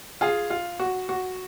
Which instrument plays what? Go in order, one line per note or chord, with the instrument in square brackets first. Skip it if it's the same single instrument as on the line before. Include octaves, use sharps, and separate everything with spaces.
[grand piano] F4 G#4
F4
F#4
F#4